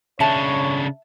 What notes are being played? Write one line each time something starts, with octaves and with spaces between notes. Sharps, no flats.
C#3 D4 C#5 E5 A5